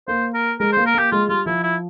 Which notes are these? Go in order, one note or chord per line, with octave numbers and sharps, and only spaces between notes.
A#3 C5
A#4
G#3 A#4
C5
A#3
A#4
A#3 G4
G#3 F4
G3 F4
F3 E4
E4